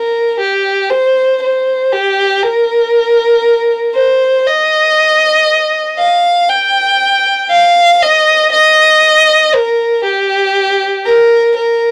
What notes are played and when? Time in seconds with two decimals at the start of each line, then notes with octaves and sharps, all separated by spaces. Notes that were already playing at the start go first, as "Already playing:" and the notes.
Already playing: A#4
0.40 G4
0.90 C5
1.42 C5
1.92 G4
2.43 A#4
3.95 C5
4.47 D#5
5.99 F5
6.49 G5
7.51 F5
8.02 D#5
8.52 D#5
9.54 A#4
10.04 G4
11.05 A#4
11.56 A#4